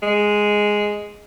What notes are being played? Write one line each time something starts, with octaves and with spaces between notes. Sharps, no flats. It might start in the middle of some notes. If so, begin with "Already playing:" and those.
G#3